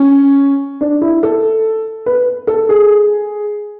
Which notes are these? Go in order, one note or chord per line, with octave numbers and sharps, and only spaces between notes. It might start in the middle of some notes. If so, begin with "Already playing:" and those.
Already playing: C#4
D4
E4
A4
B4
A4
G#4